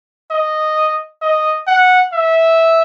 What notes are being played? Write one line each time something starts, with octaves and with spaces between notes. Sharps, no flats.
D#5
D#5
F#5
E5